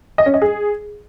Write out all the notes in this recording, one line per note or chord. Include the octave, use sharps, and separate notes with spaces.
D#5
C#4
D#5
G#4